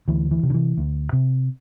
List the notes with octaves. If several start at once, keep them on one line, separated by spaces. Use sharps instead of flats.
D2 E3
E3
C3
D3
E3
D2
C3